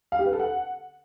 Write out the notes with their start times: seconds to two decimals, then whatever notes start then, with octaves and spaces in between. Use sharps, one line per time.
0.12 F5
0.19 G4
0.26 B4
0.33 A4
0.40 F#5